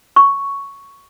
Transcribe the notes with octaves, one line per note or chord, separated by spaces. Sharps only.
C#6